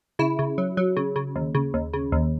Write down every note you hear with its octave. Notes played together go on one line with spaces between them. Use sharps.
C#3 E4
C#3
F#3
F#3
C#3
C#3
D#2
C#3
D#2
C#3
D#2